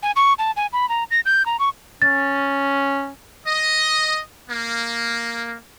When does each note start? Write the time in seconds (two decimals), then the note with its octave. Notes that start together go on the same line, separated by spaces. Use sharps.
0.03 G#5
0.16 C#6
0.39 A5
0.56 G#5
0.73 B5
0.89 A#5
1.11 A#6
1.25 G6
1.46 A#5
1.59 C#6
2.02 C#4 A6
3.46 D#5
4.49 A#3